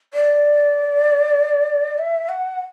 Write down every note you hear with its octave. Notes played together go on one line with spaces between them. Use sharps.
D5
E5
F#5